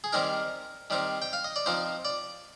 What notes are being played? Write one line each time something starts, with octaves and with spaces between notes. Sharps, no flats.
G#4
D#3 G3 C4 D#4 A#4
D#3 G3 C4 D#4
G5
F5
D#5
D5
F3 C4 D#4 C5
D5